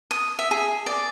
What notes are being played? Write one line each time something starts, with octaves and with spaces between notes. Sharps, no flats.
D#6
E5
G#4
D5